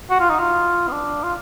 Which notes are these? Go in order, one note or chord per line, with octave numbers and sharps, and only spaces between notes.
F#4
F4
D#4
F4
B3
D4
F4